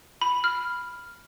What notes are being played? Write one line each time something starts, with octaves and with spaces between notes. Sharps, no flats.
B5
F6